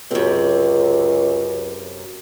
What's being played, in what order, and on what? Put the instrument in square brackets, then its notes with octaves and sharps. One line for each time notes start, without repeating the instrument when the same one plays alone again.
[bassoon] C#2 [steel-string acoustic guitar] F#2 C3